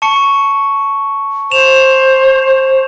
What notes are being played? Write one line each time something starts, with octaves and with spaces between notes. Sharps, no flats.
A5 C#6 C#7
C5 E7 F7